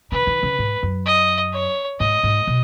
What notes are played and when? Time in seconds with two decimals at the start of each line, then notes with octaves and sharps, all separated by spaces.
0.11 C#3 B4
0.27 D#3
0.43 C#3
0.59 G#2
0.83 F#2
1.06 D#5
1.53 C#5
2.00 G#2 D#5
2.23 G#2
2.47 B2